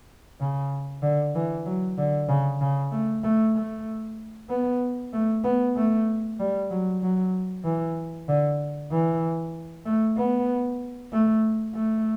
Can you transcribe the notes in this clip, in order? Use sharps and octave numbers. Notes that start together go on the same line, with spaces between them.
C#3
D3
E3
F#3
D3
C#3
C#3
A3
A3
A3
B3
A3
B3
A3
G3
F#3
F#3
E3
D3
E3
A3
B3
A3
A3